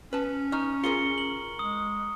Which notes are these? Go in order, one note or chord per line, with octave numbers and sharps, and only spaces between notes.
C#4 B4 A5
D#4 A#5 C#6 F6
F4 G#4 A#4 C#7 G7
F#7
G#3 D#6